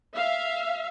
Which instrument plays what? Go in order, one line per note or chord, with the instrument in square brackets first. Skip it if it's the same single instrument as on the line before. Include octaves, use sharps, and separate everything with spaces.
[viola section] E5 F5